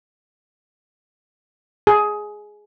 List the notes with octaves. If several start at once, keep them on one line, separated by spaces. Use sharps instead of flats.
G#4